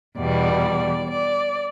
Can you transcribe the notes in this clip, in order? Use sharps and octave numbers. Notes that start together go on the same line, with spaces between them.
E2 B2 G3 D5
D5